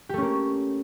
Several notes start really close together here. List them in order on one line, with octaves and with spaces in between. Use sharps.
G4 A3 C#4 A#3